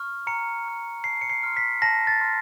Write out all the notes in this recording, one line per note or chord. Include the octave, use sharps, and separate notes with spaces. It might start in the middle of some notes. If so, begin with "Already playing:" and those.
Already playing: C#6 F6
A#5 C#7
C#6 F6
A5 C7
C#7
C7
C6 F6
B6
A5 A#6
A6
C6 F6